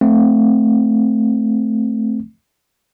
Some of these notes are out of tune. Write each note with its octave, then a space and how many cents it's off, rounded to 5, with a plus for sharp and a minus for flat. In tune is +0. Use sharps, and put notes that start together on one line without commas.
A3 +0 C4 +0